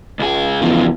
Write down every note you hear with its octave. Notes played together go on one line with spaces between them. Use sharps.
C#2 G#4
E2 C#3 F3